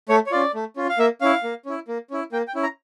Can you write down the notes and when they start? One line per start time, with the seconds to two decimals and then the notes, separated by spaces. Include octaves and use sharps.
0.09 A3 C#5
0.26 C#5
0.31 C#4 F4 D5
0.54 A3
0.76 C#4 F4
0.89 F5
0.98 A#3 E5
1.21 C#4 E4 F5
1.43 A#3
1.65 C#4 E4
1.88 A#3
2.10 C#4 E4
2.32 A#3 G5
2.48 G5
2.55 C#4 E4
2.63 A#5